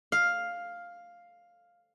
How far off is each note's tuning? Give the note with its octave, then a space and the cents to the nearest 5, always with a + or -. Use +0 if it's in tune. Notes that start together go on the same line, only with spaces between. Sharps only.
F5 +5